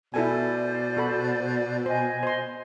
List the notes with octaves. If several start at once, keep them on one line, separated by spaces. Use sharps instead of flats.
B2 E4 A4 C5 D5 G#5
F#4 A4 B5
C5 D#5 G#5
C5 C6